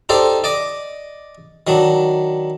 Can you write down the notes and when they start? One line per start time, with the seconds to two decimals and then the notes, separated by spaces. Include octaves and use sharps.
0.09 D#4 G4 A4 C5 D5
0.44 D5 D#5 D6
1.67 D#3 F#3 D4